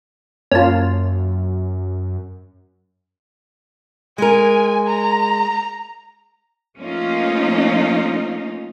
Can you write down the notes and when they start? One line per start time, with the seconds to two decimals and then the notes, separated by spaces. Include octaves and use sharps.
0.52 F#2 A#3 C#4 F4 A5
4.18 G#3 A#4 G#5
4.87 A#5
6.78 F3 A3 A#3 C#4 D#4 F4